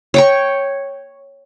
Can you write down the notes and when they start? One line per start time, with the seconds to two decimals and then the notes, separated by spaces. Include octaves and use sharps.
0.14 C#5 G5 C#6